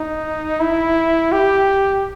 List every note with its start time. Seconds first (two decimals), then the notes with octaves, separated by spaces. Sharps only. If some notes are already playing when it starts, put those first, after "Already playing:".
Already playing: D#4
0.60 E4
1.32 G4